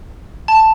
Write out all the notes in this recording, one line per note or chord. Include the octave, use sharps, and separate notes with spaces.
A5